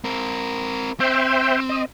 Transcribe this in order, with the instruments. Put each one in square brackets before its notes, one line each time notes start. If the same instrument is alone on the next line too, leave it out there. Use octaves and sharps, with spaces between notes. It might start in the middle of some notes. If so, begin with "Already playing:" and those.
[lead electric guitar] C4 A#4
[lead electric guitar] C4 [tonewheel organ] C5 E5 G5
[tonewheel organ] D#5